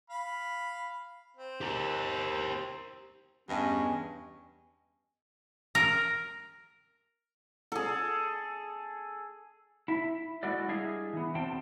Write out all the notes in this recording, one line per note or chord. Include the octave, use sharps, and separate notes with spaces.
F5 B5
C4
G4 A#4
E2 G2 C#4 D#5 G#5
A#4
G#4 A4
E4 E5
G#3 E4 F#4 A4 D5
G3 D4 E4 G#4 D#5 F5
E3 B3
E2 B2 C4 G5 A5